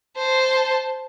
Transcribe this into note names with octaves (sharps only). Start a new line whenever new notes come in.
C5 A5